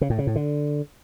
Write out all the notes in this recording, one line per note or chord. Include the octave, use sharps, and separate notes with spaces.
C#3
A2
C#3
A2
D3